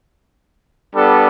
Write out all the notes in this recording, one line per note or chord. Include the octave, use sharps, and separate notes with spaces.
G3 B3 D4 A4